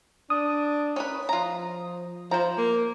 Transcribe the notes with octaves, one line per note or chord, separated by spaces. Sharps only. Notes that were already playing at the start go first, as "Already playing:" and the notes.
D4 D#6
C#4 A#4 B4
F3 F4 A#5
F3 C5 A#5
A#3